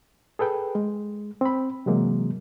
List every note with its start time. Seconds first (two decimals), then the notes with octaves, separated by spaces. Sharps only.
0.39 G#4 A4 B4 G5
0.75 G#3
1.41 C4 B5
1.86 C3 E3 F#3 G#3 A#3